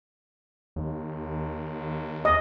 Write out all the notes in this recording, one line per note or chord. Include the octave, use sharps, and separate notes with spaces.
D#2
D#5